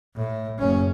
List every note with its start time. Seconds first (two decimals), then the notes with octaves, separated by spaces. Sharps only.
0.16 A2
0.59 F#1 C#4